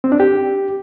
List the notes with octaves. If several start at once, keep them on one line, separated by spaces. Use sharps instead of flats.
C4
D4
G4